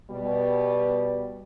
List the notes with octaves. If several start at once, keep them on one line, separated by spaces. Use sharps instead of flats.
B2 G3